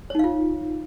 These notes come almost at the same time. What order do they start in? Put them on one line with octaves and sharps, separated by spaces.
C#5 D#4 F5 F4